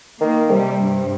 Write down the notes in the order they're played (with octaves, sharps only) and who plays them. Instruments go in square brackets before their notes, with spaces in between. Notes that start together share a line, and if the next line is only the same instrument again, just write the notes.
[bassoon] D#3 [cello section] A#3
[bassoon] C3 [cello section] G3
[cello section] G2